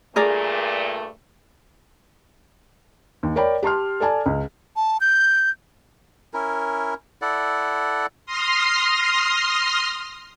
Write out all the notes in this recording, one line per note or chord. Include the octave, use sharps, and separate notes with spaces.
G2 A#2 A3 G#4 A#4 D5
D#2
A#4 C#5 D5 G5 B5
G4 A5 C6 F6
A4 D5 G#5 A5
C#2
A5
G6
C#4 E4 A#4
E4 A4 D5 F#5
C6 D#6 F6 A#6 C7